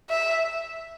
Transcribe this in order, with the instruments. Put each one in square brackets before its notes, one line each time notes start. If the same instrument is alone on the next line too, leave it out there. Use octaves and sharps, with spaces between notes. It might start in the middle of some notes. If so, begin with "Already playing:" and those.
[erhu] E5